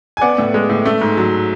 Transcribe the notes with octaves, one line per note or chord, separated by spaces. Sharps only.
G#5
B3 D5 F#5
A2
G#3
A2
A3
G#2
F#3